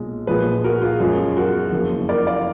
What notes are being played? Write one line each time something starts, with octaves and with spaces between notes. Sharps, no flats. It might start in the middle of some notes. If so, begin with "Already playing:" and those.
Already playing: B1 A#2 G#3
A#1 A#2 F3 G#3 G#4 B4
F#4 A#4
F4 G#4
F#2 F3 G#3
F#4 A#4
F#1 F2 F3 A#3
A#4 D5
D5 F5